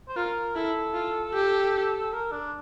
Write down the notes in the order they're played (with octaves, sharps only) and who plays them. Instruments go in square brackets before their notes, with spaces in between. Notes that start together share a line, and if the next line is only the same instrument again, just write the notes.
[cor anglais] C5
[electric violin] F4 [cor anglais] A#4
[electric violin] E4 [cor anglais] A4
[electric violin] F4
G4
[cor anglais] A#4
D4